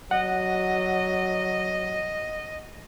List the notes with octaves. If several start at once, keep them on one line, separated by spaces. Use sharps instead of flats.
F#3 D#5 F#5